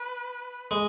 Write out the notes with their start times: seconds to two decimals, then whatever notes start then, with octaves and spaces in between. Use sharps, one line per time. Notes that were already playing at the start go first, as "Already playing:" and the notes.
Already playing: B4
0.71 G#3